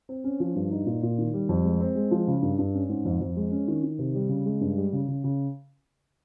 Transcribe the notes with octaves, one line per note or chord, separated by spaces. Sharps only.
C4
C#4
F3
G2
D#4
A#2
A#2
D#3
G3
F2
G#3
C4
G#3
F3
C#3
G2
G2
C#4
G#2
F2
F2
G#3
C#4
D#3
D#3
C3
G3
C#3
G#3
G2
G3
C#3
C#3
C#3